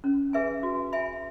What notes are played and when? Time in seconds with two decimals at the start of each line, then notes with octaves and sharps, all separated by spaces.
0.04 C#4
0.33 G#4 B4 E5 G#5
0.63 F#4
0.93 E5 G#5 B5